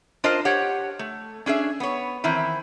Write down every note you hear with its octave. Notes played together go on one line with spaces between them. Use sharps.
D4 F4 A#4 C5 D#5 A5
G4 C#5 F#5
A3
C#4 D4 G#4 E5
B3 C#5
D#3 E3 C4 E4